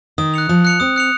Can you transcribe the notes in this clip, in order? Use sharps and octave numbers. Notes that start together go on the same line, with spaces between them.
D#3 D#6
F#6 C#7 F7
F3 D#6
F#6 C#7 F7
C4 D#6
F#6 C#7 F7